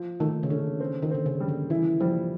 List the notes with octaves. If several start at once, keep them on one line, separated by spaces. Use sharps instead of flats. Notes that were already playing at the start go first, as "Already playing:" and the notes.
Already playing: F3
D#3 A3
C#3
D3 C#4
C4
D#3
D3 C4
C#3
G3
D3
E3 E4
F3 G3